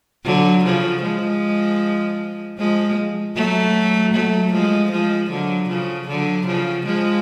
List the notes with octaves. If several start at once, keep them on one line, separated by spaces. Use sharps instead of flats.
D3 F#3
C#3 F3
F3 G#3
F3 G#3
F#3 A3
F#3 A3
F3 G#3
F3 G#3
D3 F#3
C#3 F3
D3 F#3
C#3 F3
F3 G#3